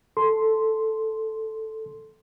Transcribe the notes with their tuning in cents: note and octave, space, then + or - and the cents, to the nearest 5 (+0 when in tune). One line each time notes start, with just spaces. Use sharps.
A4 +0 C6 +0